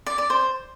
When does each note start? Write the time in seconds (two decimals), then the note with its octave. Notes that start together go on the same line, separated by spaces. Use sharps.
0.06 D5
0.18 D5
0.30 C5